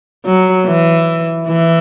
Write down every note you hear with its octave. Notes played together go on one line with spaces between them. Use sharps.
F#3
E3
E3